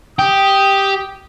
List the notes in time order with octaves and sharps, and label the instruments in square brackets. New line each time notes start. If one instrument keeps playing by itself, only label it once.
[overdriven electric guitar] G4 [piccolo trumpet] D#6